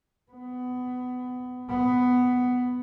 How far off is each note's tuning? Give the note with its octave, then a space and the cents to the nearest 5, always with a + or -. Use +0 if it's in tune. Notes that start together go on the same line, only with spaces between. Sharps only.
B3 +20
B3 +10